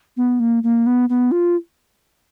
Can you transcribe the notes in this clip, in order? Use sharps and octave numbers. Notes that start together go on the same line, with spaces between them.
B3
A#3
A#3
B3
B3
F4